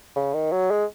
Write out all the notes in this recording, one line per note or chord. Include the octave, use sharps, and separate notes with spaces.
C#3
D#3
F#3
G#3